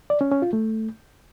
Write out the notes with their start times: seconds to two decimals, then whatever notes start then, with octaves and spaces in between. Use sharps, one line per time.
0.10 D5
0.21 C#4
0.31 C#4
0.42 F4
0.53 A3